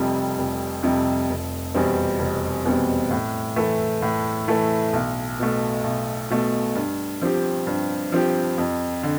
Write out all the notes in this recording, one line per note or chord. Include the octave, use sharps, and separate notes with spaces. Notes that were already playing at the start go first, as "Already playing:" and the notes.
Already playing: F1 F2 C3 G3
F1
F2 C3 G3
F1
E2 B2 G3 C4
F1
E2 B2 G3 C4
A2
E3 A3 E4 A4
A2
E3 A3 E4 A4
B1
B2 A3
B1
B2 A3
G2
F3 C4 G4
G2
F3 C4 G4
F2
D3